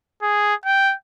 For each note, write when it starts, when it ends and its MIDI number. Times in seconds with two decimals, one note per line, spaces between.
0.22 0.54 68
0.65 0.94 79